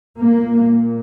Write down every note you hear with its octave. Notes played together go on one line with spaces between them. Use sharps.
A#2 A#3